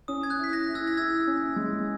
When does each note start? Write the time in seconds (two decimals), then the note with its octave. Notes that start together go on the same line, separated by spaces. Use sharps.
0.08 C#4 D#6
0.23 G#6
0.30 F#6
0.38 E4
0.44 B6
0.53 F#6 A#6
0.68 E4
0.75 E6 G#6
0.87 A#6
0.97 E4 E6 G#6
1.27 C#4
1.56 G#3